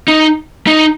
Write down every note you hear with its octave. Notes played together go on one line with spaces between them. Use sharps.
D#4
D#4